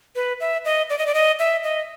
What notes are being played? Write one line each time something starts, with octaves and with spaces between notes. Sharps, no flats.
B4
E5
D#5
D5
D#5
D5
D#5
E5
D#5